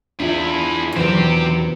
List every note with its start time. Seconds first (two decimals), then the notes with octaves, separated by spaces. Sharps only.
0.20 E2 D4 E4 F4 G#4 E5
0.96 E2 B2 D#3 F#3 C4 G4 B4 C5